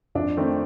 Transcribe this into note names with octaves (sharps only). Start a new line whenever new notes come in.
F2 D4
D#3 A3 C4